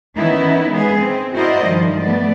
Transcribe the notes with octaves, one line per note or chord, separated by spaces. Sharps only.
D#3 E3 B3 C#4 D#4 E4
G#3 B3 G#4
C4
E4 F#4 A#4 C5 D5 D#5
G2 D#3 F3
A3 B3 D5